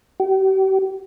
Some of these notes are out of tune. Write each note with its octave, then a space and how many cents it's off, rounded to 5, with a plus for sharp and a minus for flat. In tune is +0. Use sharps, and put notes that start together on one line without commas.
G4 -40